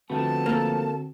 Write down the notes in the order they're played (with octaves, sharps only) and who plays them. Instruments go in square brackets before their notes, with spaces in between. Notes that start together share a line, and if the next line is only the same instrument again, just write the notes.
[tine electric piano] D3 C4 F#4 [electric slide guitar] F3 A3 B3 [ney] A5
[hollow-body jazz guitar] A#3 A4